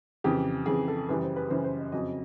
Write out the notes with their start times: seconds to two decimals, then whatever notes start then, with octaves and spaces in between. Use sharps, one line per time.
0.24 F2 C#3 E3 G4
0.66 F2 C#3 E3 G#4
0.88 A4
1.09 F#2 C#3 E3 G3 B4
1.22 C5
1.36 B4
1.50 F#2 C#3 E3 G3 C5
1.64 C5
1.79 D#5
1.92 F2 C#3 F#3 D#5